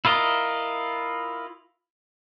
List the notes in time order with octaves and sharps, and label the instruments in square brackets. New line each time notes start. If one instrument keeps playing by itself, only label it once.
[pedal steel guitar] E4 F4 A#4 D#5